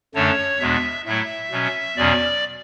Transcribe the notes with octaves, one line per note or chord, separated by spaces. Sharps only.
F#2 D3 A3 D4 C#5
E2 B2 G#3 D4 E5
A2 F#3 A3 E4 E5
B2 F#3 C#4
E2 B2 F#3 C#4 D5